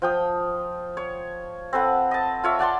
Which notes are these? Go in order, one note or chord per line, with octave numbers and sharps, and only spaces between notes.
F3 G5 D#6
C#5
C4 A4 B4 F#5
D#5 A5
F4 C#5 E5
D5 F#5 A5 C6